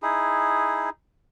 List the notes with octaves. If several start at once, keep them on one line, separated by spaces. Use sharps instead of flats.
D#4 E4 G#4